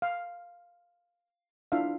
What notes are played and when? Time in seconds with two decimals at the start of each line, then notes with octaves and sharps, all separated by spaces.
0.02 F5
1.72 D4 E4 F4 E5 F5